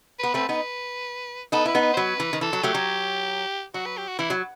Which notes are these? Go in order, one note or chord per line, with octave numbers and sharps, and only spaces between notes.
B3 B4
A3 C4 B4
B3 D#4 B4
B3 D#4 A4
E4 B4
B3 D#4
B4
C5
F#3 B4
E3
D#3
E3 A4
F#3
F#3 A3 G4
F#3
F#3 F#4
B4
G4
F#4
E3 E4
F#3